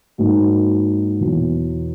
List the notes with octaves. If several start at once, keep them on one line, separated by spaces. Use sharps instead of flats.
G#2 F#3 A#3 D#4 F#4
E2 B2 F#3